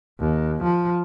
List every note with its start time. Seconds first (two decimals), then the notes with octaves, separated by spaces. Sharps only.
0.20 D#2
0.63 F3